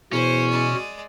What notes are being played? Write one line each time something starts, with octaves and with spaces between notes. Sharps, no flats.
E2 B2 C#4 C5
G#3 D5